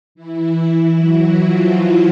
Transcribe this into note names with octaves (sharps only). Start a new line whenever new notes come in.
E3 E4
F#3 F#4
F3 F4